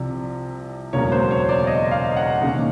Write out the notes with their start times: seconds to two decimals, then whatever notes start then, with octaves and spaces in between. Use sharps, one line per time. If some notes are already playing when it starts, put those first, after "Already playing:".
Already playing: C2 C3 F3
0.93 E1 D2 C#3 F#3 A#3 C#5
1.12 C5
1.31 C#5
1.49 D5
1.67 D#5
1.91 F5
2.16 F#5
2.41 E1 D#2 C#3